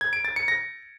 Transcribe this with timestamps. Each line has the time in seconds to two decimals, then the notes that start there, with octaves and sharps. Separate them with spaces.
0.01 G#6
0.13 D7
0.25 A6
0.36 C#7
0.48 A#6